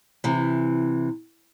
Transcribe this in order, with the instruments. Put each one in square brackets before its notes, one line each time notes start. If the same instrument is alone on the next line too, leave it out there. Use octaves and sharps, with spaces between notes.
[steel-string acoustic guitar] C3 E3